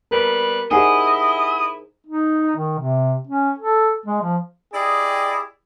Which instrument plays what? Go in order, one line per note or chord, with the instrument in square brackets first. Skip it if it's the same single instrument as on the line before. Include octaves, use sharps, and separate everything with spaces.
[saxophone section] G3 B3 B4 [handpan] A#4
[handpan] D#4 G#4 C5 [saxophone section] E4 [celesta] G4 F#5 G#5 [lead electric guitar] D#5
[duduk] D#4
D#3
C3
C#4
A4
G#3
F3
[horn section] E4 G4 G#4 D5 D#5